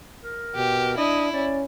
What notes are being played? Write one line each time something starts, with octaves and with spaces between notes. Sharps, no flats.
A#4
B2 G4
D4 E4 D#5
C#4 D5